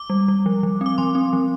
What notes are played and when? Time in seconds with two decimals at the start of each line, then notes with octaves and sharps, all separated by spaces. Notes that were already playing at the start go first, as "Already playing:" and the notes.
Already playing: D6
0.10 G3
0.28 G3
0.46 F3
0.63 F3
0.81 C4 D6
0.98 F3 C6
1.15 C4
1.33 F3